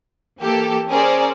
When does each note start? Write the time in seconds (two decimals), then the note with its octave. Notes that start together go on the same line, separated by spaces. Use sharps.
0.40 E3 A#3 G4 A4
0.88 C#4 G#4 A#4 C5 D5